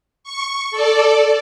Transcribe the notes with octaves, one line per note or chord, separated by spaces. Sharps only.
C#6
A4 D5